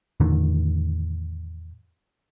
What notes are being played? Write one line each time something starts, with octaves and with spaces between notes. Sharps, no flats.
E2 A2 D3 D#3